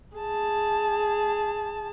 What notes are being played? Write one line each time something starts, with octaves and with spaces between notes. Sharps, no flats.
G#4 A5